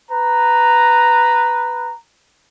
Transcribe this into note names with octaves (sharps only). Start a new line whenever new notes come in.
B4 A#5